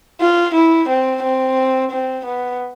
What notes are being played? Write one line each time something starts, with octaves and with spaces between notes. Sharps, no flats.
F4
E4
C4
C4
C4
B3